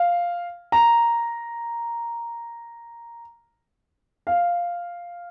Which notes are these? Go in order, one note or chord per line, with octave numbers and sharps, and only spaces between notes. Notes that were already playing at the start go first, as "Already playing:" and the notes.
Already playing: F5
A#5
F5